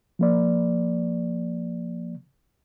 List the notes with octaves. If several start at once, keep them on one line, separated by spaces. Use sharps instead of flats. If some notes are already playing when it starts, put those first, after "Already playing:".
F3 A#3 D5